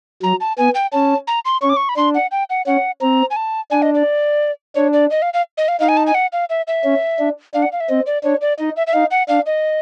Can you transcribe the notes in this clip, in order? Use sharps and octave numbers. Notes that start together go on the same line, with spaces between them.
F#3 A#5
A5
B3 G#5
G5
C#4 A5
A#5
C6
C#4 C#6
D6
C#6
B5
D4 C6
F#5
G5
F#5
C#4 F#5
C4 A#5
G#5
A5
D4 G#5
D#5
D5
D4 C#5
D5
D#5
F5
F5
D#5
F5
D#4 F5
G#5
A5
G#5
F#5
F5
E5
E5
C#4
D4
D4 F5
F#5
F5
E5
C4 D#5
D5
D4 C#5
D5
D#4 D#5
E5
E5
D#4 F5
F#5
D4 F5
D#5